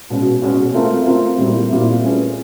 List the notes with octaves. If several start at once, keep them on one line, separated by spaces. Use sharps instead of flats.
B2 G#3 C#4 F#4
B2 G#3 C#4 F#4
A3 C4 F4 A#4
A3 C4 F4 A#4
A#2 G3 C4 E4
A#2 G3 C4 E4
A3 C#4 F4 G#4 B4